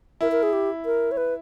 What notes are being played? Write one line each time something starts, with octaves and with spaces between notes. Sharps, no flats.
E4 A#4
A#4
G#4
G4
A#4
C#5
B4